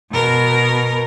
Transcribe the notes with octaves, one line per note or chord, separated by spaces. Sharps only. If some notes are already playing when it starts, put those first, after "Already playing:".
B2 A#4